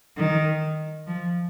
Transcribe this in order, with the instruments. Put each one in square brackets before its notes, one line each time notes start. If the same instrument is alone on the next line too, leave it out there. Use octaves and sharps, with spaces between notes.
[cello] D#3
F3